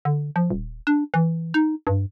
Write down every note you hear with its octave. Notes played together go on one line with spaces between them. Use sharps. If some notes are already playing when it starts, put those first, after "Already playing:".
D3
F3
D#1
D4
E3
D#4
G2